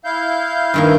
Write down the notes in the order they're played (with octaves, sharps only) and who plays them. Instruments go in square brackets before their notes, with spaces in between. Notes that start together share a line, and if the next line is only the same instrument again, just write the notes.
[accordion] E4 F5 G6
[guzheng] G2 D#3 A#3